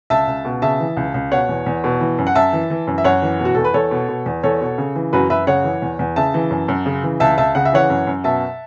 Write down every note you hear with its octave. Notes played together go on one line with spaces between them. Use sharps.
C#2 E5 A5
C#2
B2
C#3 E5 A5
E3
C#2
C#2
B2 C#5 F#5
E2
E2
B2
E3
F#2
F#5
F#2 E5 A5
E3
E3
F#2
E5
F#2 C#5 F#5
E3
B2
F#4
E2 A4
B4
E2 A4 C#5
B2
B2
E2
E2 A4 C#5
B2
C#3
E3
F#2 F#4 B4
F#2 B4 E5
C#3 C#5 F#5
E3
E2
E2
C#3 E5 A5
E3
F#2
F#2
C#3
E3
C#2 E5 A5
C#2 E5 A5
C#3 F#5
E5
E3 C#5 F#5
F#2
F#2
B2 E5 A5